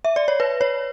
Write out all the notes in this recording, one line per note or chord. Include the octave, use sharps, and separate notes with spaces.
E5
D5
C#5
B4
C#5